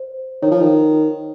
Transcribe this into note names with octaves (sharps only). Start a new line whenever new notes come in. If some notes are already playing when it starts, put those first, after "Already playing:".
Already playing: C5
D#3 C#5
F3
D#3